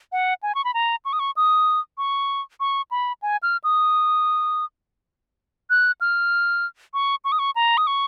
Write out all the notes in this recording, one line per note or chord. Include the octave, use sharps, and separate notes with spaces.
F#5
G#5
C#6
B5
A#5
C#6
D#6
C#6
D#6
C#6
C#6
B5
G#5
F6
D#6
F#6
F6
C#6
C#6
D#6
C#6
A#5
D#6
C#6